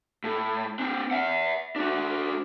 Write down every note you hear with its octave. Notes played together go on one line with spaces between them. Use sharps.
A2
C4 D4
E5 F#5
D4 F#4